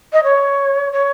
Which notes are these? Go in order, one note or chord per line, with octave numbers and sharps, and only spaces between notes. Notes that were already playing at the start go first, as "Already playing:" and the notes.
D#5
C#5
C#5